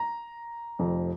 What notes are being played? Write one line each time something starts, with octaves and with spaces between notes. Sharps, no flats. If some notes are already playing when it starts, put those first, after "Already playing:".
Already playing: A#5
F1 F2 F3